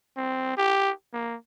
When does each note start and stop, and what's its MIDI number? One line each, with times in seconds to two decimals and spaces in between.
0.17 0.55 60
0.57 0.92 67
1.13 1.36 58